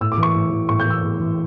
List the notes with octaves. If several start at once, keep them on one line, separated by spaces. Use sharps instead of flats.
A2 E6
D6
E3
C#6
A2
E3
A2 C#6
G6
E3
E6
A2
E3